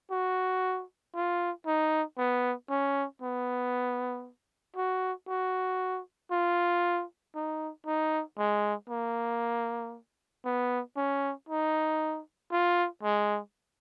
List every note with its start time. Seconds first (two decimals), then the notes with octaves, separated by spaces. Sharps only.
0.11 F#4
1.15 F4
1.66 D#4
2.18 B3
2.70 C#4
3.22 B3
4.76 F#4
5.28 F#4
6.32 F4
7.35 D#4
7.87 D#4
8.38 G#3
8.89 A#3
10.45 B3
10.97 C#4
11.49 D#4
12.52 F4
13.03 G#3